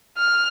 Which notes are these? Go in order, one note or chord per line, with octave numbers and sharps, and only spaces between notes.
F6